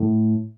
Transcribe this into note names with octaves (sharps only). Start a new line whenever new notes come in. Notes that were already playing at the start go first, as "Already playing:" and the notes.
Already playing: A2